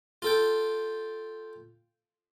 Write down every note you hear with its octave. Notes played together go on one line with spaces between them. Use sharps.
F4 A4 G5